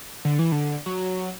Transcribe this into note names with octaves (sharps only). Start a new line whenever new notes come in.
D3
E3
D3
F#3